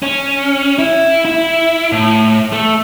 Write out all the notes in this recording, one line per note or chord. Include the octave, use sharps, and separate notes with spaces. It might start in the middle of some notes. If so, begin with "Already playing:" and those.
C#4
E4
E4
A2
A3